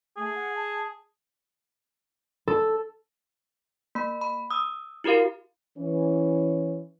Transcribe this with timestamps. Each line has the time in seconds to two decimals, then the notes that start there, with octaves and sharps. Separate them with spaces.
0.17 A3 G#4
0.35 F#5
0.55 A5
2.48 A4
3.95 A#3 B5
4.21 B5
4.51 D#6 E6
5.04 E4 F#4 G4 A#4 F5
5.78 E3 C#4